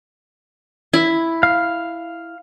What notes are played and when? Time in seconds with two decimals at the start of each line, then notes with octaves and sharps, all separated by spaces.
0.93 E4
1.43 F5